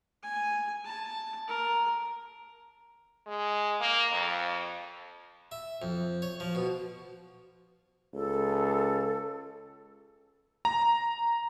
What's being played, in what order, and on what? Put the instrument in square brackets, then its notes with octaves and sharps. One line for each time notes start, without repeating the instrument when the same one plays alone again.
[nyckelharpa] G#5
A5
A#4
[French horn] G#3
A#3
F2
[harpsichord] E5
F2
C#5
F3
B2
[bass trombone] C#2 [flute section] A4
[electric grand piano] A#5